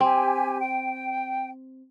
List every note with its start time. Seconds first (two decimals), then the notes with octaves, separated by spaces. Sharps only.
0.01 C4 G4 G#5
0.60 G5